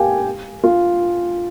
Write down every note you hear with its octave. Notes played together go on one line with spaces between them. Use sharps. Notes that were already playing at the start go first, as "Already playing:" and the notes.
Already playing: G4 F5 G5 G#5
F4